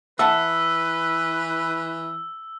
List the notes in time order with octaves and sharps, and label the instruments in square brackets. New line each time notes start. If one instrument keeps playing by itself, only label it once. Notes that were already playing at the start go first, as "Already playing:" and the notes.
[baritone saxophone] E3 [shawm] B4 [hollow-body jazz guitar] E5 F#5 A5 [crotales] E6